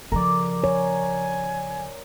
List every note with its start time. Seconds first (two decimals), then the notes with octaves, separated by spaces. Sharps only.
0.12 C#3 F3 A#4 D5
0.64 C#5 G#5